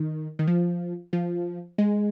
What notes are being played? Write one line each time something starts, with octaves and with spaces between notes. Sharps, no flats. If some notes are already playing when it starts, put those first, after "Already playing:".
Already playing: D#3
D#3
F3
F3
G#3